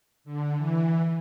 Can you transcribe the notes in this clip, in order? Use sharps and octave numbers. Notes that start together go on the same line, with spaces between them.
D3
E3